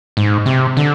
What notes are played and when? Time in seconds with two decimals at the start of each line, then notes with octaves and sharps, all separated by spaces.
0.17 G#2
0.46 C3
0.77 D3